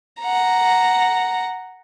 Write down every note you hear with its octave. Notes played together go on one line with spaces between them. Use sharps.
F#5 A#5